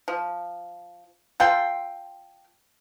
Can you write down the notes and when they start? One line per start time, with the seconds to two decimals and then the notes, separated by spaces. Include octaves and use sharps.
0.08 F3
1.40 F4 A4 G5 C6